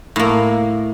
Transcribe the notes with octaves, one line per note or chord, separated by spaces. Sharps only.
A2 A#3